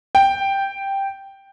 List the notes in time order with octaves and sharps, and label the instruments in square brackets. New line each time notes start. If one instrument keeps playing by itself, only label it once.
[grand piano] G5